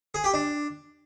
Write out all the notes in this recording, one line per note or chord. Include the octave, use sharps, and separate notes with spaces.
G#4
G4
D4